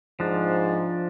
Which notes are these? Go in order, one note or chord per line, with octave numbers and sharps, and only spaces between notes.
G#2 F3 D4